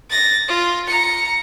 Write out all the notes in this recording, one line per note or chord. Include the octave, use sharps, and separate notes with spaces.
A6 A#6
F4
A#5 C#7